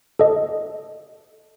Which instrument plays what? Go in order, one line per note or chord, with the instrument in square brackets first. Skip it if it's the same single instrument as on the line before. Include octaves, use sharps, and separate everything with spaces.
[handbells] A4 D#5